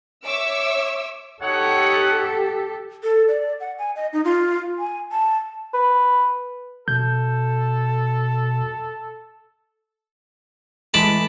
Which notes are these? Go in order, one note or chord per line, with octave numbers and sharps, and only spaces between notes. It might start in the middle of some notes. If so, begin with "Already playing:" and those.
C#5 E5 C#6 D6 E6
D#4 G4 A4 C#5 F#5
A4
D5
F#5
G#5
D#5
D#4
F4
G#5
A5
B4
B2 A4 G6
E3 G#3 A3 A5 B5 D6